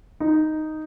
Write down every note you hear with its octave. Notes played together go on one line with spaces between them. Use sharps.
D#4